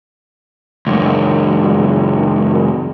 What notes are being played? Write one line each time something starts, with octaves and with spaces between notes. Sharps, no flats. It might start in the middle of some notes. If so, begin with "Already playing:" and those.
C#2 F#2